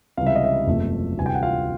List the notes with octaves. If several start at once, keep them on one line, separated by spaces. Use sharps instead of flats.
C#2 C3 E3 G3 F5
E5
D#5
E5
F#1 E2 C3 F3 A3
D2 C3 E3 G3 G#5
G5
F#5
F4 F5